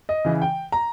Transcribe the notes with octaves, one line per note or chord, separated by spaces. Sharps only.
D#5
C#3 E3
G5
A#5